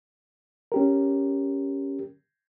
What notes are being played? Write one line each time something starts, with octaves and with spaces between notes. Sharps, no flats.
C#4 G4 A#4